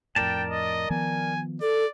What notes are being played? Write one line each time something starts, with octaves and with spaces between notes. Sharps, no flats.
F2 A2 A#4 D5 G5 A5
D#5
D#3 F3 B3 G#5
A4 D5